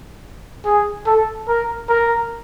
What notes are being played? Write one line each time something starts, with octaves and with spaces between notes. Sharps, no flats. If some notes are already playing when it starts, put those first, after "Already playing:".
G#4
A4
A#4
A#4